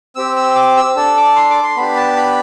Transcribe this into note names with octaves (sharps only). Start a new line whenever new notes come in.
C4 G4 E6
E6
D6
E6
D4 A4 E6
D6
C6
D6
C6
B3 D4 G4 B5
A5
B5